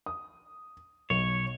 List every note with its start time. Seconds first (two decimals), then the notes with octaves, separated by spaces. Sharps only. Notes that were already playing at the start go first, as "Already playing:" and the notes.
0.06 D#6
1.10 B1 C#5